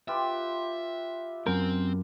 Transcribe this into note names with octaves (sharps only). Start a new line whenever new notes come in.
F4 G4 B4 E5
F#2 C4 A#4